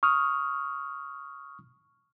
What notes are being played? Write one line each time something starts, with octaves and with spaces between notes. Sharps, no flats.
C#6 D#6 F6